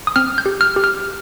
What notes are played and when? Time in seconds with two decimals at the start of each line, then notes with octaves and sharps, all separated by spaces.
0.07 D#6
0.16 C4 F6
0.38 G6
0.46 G4
0.61 F6
0.76 G4
0.84 F6